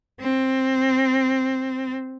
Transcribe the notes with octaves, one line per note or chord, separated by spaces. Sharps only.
C4